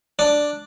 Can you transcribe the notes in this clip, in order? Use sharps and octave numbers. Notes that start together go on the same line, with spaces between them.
D4